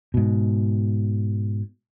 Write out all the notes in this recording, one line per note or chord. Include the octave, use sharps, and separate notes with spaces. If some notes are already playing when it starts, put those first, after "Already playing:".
G#2 B2